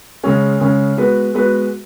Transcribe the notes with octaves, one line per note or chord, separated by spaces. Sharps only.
C#3 G#3 C#4
C#3 G#3 C#4
G#3 B3 F#4 B4
G#3 B3 F#4 B4